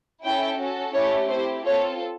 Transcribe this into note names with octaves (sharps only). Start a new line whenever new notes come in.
C#4 E4 A4 G5
C#4 F#4 A4
A3 C#4 E4 G4 C#5
C4 E4 G4 C5
C4 F4 A4 C#5